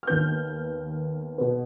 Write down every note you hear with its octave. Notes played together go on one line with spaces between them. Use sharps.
F6
D#2 D#3 B3 G6
B2 B3